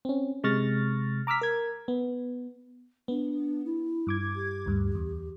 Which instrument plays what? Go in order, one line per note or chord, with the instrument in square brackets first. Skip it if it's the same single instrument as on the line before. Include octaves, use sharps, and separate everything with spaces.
[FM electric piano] C4 C#4
C3 G#3 C#6 F6 A6 A#6
A#5 D6 E6 F6 B6
A#4 G#6
B3
[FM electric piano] B3 [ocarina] D4
[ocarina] E4
[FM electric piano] G2 D6 G#6
[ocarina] G4
[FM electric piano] D2 G2
E2